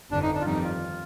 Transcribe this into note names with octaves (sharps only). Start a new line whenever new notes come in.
G1 F2 D3 D4
D#4
D4
F4
G1 F2 D#3 G3 D#4
F4